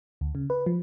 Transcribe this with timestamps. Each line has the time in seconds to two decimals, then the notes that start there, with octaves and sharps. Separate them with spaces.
0.21 D2
0.35 C#3
0.50 B4
0.66 F3